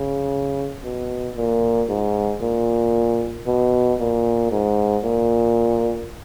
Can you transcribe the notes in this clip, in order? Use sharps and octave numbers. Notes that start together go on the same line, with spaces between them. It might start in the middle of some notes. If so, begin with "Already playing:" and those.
Already playing: C#3
B2
A#2
G#2
A#2
B2
A#2
G#2
A#2